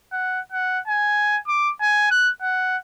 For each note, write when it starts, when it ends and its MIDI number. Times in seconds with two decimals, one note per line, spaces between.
0.12 0.40 78
0.52 0.79 78
0.87 1.38 80
1.48 1.72 86
1.81 2.09 80
2.11 2.31 90
2.42 2.77 78